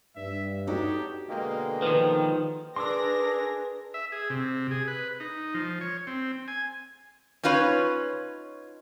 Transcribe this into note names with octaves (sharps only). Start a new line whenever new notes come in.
G2 E5
D4 D#4 F#4 G4 A4 C#5
B2 D3 G#3 A#3 D#5 G5
D#3 F3 B4
D4 G#4 A#4 B4 C6 D6 E6 A#6
E5
G#4
C3
G#4
B4
D#4
F3
C#5
C4
G#5
C#4 D#4 F4 B4 C#5